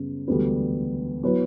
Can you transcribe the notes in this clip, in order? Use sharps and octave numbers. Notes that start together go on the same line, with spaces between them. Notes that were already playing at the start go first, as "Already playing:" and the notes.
Already playing: F#2 C#3 G3 B3
E1 D2 D3 G3 B3
F#3 B3 E4 B4